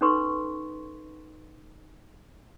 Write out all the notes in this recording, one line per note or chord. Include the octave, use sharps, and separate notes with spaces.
C#4 D#4 A4 B4 C6 C#6